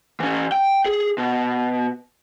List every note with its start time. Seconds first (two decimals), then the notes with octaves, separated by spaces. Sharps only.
0.20 E3 C#4
0.52 G5
0.86 G#4
1.18 B2